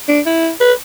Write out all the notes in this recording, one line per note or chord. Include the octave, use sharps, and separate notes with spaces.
D4
E4
B4